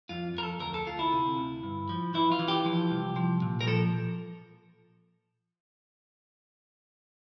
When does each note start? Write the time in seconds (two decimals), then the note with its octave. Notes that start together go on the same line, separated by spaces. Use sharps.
0.09 F2 F4
0.35 F2 A#4
0.43 A4
0.60 D2 A#4
0.74 A4
0.87 D2 F4
0.99 E4
1.12 C3
1.38 D2
1.63 G2
1.89 F3
2.14 E3 E4
2.32 F4
2.39 E3
2.48 G4
2.65 F3
2.91 C2
3.16 F3
3.42 A#2
3.61 A#4
3.67 F3 A4